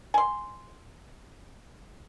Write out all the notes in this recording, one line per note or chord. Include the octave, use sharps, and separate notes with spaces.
G#5 C6